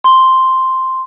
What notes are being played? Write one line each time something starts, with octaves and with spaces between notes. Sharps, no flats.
C6